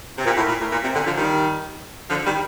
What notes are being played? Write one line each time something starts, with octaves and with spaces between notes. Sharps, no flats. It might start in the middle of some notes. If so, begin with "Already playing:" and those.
C3
A#2
A2
A#2
A2
A#2
C3
A#2 D3
D3 F3
D#3 G3
D3 F3
D#3 G3